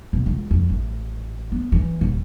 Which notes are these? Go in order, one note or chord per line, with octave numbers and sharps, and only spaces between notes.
B2
C#2
F2
A1
B3
E3
D#1